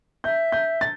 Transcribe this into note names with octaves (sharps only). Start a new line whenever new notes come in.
E5 G6
G6
A6